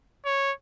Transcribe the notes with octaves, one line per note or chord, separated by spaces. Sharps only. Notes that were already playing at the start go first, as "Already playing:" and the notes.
C#5